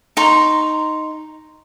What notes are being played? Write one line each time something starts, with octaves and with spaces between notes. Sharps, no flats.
D#4 A#5 C6 C#6